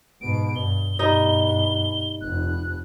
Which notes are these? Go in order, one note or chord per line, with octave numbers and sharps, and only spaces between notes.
G#2 B2 D7
G2 G7
G2 B2 G3 D#4 D#5
F1 F#6